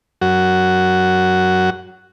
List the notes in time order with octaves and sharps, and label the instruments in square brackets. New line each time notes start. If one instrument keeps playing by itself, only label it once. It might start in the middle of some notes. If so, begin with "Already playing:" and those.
[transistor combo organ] F#2 F#4